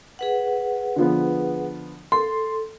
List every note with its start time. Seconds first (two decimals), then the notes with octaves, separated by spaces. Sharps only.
0.19 G#4 B4 F#5
0.96 D3 F3 B3
2.12 A4 C6